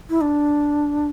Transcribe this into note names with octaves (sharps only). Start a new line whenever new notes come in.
E4
D4